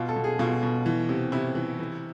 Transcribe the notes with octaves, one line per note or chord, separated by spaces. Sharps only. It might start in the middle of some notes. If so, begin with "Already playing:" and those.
Already playing: B2 F4
A4
B2
G#4
B2 F4
B2
E3
C3
C3 E4
E3
E3